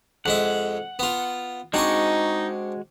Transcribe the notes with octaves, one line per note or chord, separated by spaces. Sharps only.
F2 G#3 E5 F#5
B3 F4
G#3 C4 D4 D#4 F#4 G#4 C#6